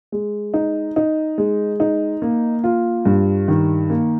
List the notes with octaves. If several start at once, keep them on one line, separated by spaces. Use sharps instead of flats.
G#3
D#4
D#4
G#3
D#4
A#3
F4
G2
D#3
A#3